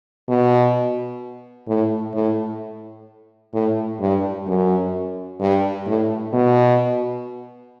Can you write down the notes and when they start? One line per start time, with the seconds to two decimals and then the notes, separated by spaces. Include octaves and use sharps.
0.28 B2
1.68 A2
2.15 A2
3.53 A2
4.00 G2
4.47 F#2
5.40 G2
5.86 A2
6.33 B2